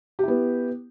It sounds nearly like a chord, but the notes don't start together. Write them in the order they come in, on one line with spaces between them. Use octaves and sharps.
G4 E4 B3